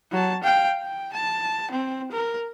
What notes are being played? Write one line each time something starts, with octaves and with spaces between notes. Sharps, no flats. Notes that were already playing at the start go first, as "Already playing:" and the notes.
F#3 A5
F5 G5
G5
A5
C4
A#4